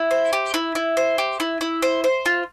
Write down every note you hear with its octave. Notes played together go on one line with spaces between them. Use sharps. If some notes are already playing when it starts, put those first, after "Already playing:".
Already playing: E4
C5
G4
E4
E4
C5
G4
E4
E4
C5
C5
F4